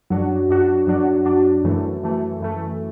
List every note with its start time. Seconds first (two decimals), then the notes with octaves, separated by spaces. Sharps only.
0.10 F#2 F#3 D4 F#4
0.49 F#2 F#3 D4 F#4
0.87 F#2 F#3 D4 F#4
1.25 F#2 F#3 D4 F#4
1.64 F#2 E3 A3
2.02 F#2 E3 A3
2.40 F#2 E3 A3